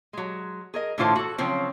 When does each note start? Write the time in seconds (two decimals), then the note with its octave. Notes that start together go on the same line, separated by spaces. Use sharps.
0.13 F#3 G#3
0.74 G#4 A#4 D#5
0.98 A2 D3 E3 F4 C5 A5
1.16 F#4 A4
1.38 C#3 F3 F#3 C4